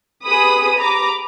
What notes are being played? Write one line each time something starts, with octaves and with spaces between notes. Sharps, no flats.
G4 G#4 B4 B5 D#6
A#5 B5 D6